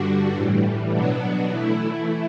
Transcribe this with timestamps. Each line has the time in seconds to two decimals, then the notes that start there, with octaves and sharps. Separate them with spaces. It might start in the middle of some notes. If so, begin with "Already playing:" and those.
Already playing: G2 D3 G3 D4 F#4
0.33 A2 E3 G3
0.91 B2 F#3 B3 D4 F#4
1.50 E3 A3 E4